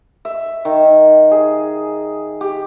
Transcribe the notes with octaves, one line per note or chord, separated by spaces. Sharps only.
E5
D#3
G#4
G4